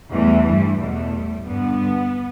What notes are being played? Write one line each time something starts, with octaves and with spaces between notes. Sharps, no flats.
E2 E3 G3 A3
G2 E3 G3
E2 B2 G3 A3
A2 G3
G2 D3 G3 B3